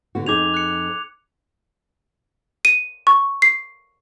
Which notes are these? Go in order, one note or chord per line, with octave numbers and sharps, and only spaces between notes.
D3 B3 F#4
F2 D#4 G#4 D6 G#6 F7
F#6 C#7
D#7
C#6
C7